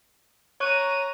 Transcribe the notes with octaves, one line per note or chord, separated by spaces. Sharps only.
C#5 A#5 C#6 F#6 D#7